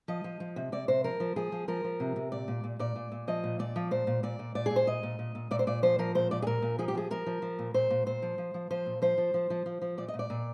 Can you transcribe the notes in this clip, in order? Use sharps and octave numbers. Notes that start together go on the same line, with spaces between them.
F3 D#5
F3
F3
C3
C3 D5
C3 C5
F3 A#4
F3
F3 G#4
F3
F3 A#4
F3
C3
C3
A#2 D5
A#2
A#2
A#2 D5
A#2
A#2
F3 D#5
A#2
A#2 D5
F3
A#2 C5
A#2
A#2 D5
A#2
A#2 D5
A#2 G#4
C5
A#2 D#5
A#2
A#2
A#2
A#2 D5
C5
A#2 D5
F3 C5
F3 A#4
A#2 C5
A#2 D5
G#4
A#2 A#4
A#2
F3 G#4
G4
F3 G#4
F3 A#4
F3
F3
A#2
A#2 C5
A#2
A#2 C5
F3
F3
F3
F3 C5
A#2
F3 C5
F3
F3
F3
F3
F3
A#2 D5
D#5
A#2
D5
A#2